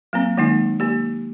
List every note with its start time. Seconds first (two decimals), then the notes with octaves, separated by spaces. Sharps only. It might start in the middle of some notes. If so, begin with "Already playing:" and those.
0.13 F#3 A#3 C4
0.37 D#3 G#3 A#3 D#4
0.80 A#3 G4